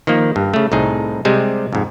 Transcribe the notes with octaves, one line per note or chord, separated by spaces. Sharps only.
D#3 F3 A#3
G2
C#3 A3
C2 A2 D#4 G#4
C3 G3 G#3 C5
F2 G#2